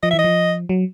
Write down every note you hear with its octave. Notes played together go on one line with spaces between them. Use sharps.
F3 D#5
E5
E3
D#5
F3
F#3